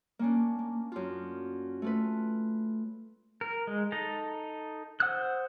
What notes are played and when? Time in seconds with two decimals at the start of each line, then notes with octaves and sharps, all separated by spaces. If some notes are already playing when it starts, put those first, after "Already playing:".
0.19 A#3 C#4 D4
0.59 A#3
0.92 F#2 F4
1.82 A3 F4 B4
3.41 A#4
3.67 G#3
3.92 D#4 A4 A#5
5.00 C5 F#5 D#6 E6 F#6